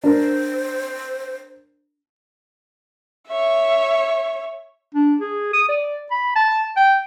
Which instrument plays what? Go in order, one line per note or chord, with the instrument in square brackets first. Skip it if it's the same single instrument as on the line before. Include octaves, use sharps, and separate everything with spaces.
[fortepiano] D4 A#4 [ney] C5
[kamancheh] C#5 E5
[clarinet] D4
G#4
D#6
D5
B5
A5
G5